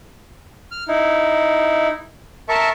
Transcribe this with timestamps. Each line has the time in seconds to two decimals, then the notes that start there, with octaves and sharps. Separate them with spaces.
0.71 F6
0.88 D#4 E4
2.49 A#4 E5 A5 C#6